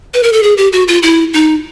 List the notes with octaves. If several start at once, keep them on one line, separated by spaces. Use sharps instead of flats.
B4
A#4
A4
G#4
G4
F#4
F4
E4
D#4